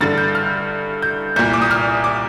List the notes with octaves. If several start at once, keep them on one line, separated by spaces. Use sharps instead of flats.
G2 D3 A6
G6
F6
G6
C2 A#2 G6
D6
D#6
F6
D6